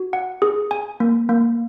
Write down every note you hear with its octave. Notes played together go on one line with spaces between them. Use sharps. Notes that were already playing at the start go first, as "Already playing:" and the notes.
Already playing: F#4
F#5
G#4
G#5
A#3
A#3